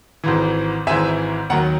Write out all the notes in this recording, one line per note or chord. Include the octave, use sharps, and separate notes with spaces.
G#1 G#2 E3
G#1 G#2 E3 E5 G#5
D#2 D#3 F#3 F#5 A#5